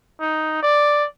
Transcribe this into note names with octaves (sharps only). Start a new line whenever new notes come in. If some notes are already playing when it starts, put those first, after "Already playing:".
D#4
D5